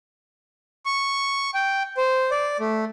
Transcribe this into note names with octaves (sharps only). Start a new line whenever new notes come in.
C#6
G5
C5
D5
A3